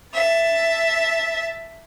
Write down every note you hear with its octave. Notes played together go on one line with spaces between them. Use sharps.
E5 A5